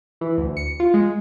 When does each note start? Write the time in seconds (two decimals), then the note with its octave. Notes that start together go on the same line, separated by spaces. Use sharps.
0.21 E3
0.38 D2
0.57 C#7
0.80 F4
0.94 G#3